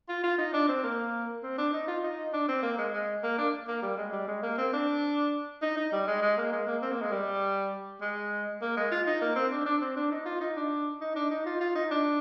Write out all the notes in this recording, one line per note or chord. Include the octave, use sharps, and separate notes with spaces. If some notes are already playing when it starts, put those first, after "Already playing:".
F4
F4
D#4
D4
C4
A#3
C4
D4
D#4
F4
D#4
D4
C4
A#3
G#3
G#3
A#3
D4
A#3
G3
G#3
G3
G#3
A#3
C4
D4
D#4
D#4
G3
G#3
G#3
A#3
G#3
A#3
C4
A#3
G#3
G3
G#3
A#3
G#3
F4
D#4
A#3
C4
D4
D4
C4
D4
D#4
F4
D#4
D4
D#4
D4
D#4
F4
F4
D#4
D4